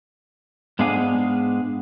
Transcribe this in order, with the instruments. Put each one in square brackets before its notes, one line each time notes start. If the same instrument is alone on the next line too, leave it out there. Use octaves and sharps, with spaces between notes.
[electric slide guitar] G#2 G#3 B3 D4 F5 G#5